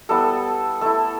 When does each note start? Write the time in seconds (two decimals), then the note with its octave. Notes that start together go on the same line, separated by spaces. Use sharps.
0.09 G3 B3 E4 A4
0.81 A3 E4 A4